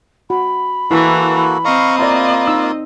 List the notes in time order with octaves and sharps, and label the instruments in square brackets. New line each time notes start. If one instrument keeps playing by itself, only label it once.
[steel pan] F#4 [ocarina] B5
[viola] E3 [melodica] A#3 F#4 A4 [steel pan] E4
[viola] C4 D#5 [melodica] F5 A#5 C#6
[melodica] A#3 F4 [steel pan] D5 E5 A#5
[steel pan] D#4 E6